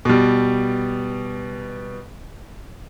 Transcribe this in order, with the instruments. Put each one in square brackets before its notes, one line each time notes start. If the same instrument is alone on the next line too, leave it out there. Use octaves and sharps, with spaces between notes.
[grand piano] B2 G3